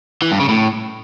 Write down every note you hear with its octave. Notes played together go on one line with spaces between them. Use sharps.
E3
G2
C#3
A2